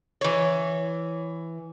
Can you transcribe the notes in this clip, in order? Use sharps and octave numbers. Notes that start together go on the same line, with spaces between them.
E3 C#5